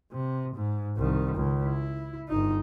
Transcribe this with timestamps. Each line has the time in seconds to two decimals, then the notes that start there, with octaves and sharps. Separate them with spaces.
0.12 C3
0.55 G#2
0.97 C2 D#3
1.36 C#2
1.65 E4
2.29 G1 D#4